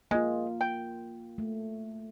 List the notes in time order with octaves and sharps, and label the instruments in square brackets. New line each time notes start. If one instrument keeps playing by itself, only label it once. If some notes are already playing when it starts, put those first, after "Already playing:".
[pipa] G#3 [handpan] A#3 F4
[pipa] G5
[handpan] A3